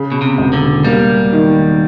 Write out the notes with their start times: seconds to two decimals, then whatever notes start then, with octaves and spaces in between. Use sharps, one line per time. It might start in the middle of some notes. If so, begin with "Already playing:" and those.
Already playing: C#3
0.12 B2
0.21 C3
0.38 E1
0.53 D3
0.84 G3 A#3
1.33 D#3